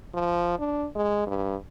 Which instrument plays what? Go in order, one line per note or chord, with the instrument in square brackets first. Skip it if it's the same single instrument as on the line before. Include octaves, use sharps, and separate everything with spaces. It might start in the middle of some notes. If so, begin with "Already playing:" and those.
[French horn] F3
D4
G#3
G2